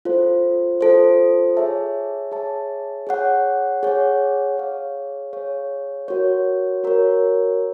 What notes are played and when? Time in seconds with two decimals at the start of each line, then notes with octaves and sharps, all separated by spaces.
0.05 F4 A4 C5
0.81 F4 A4 C5
1.57 G#4 C#5 E5 A5
2.32 G#4 C#5 E5 A5
3.07 G#4 C#5 F#5
3.83 G#4 C#5 F#5
4.57 G#4 C#5 F5
5.33 G#4 C#5 F5
6.08 F#4 A#4 C#5
6.84 F#4 A#4 C#5